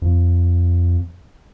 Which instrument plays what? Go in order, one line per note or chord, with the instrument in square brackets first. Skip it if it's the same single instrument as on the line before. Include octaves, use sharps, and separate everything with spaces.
[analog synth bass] F2